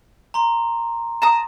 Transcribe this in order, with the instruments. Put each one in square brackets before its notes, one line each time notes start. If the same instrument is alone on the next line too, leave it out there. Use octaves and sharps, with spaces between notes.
[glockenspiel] A#5 C6
[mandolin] A5 A#5 D#6